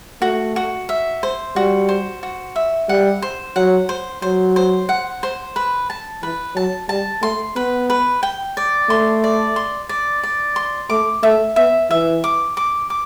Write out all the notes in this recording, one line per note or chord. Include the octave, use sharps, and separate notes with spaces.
A3 F#4
F#4
E5
C5
G3 F#4
C5
F#4
E5
G3 F#5
C5
F#3 F#5
C5
F#3 C5
C5
F#5
C5
B4
A5
E3 B4
F#3 A5
G3 A5
A3 C6
B3 B4
B4
G5
D5
A3 C6
D5
C6
D5
D5
C6
A3 D6
A3 E5
B3 E5
E3 E5
D6
D6
D6